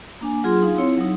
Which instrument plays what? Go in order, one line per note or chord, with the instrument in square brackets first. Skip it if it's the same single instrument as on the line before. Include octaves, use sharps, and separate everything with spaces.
[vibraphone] A#3 D4 G#5
F#3 F4 G#4 C6
D#4 F5
C4 E4 C#5
F#3 D#4